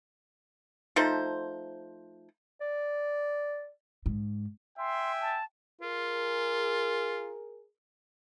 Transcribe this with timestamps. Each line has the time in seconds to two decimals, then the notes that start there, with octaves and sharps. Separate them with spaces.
0.96 F3 A3 D#4 C5
2.61 D5
4.06 G#2
4.79 E5 G5 G#5 C6
5.21 A5
5.82 F4 G#4 A#4